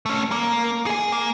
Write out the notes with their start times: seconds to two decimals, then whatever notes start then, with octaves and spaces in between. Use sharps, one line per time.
0.06 A3 C#4
0.32 A#3
0.86 G#4 G#5
1.12 A#3